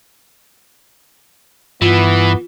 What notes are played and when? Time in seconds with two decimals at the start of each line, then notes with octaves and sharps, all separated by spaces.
1.82 G2 E3 B3 F4